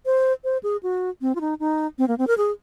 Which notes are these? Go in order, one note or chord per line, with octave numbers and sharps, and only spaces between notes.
C5
C5
G#4
F#4
C4
F4
D#4
D#4
C4
A#3
C4
A#4
G#4